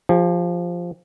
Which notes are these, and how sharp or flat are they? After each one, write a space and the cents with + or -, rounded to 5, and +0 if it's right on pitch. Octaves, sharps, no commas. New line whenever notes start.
F3 +0 G4 +45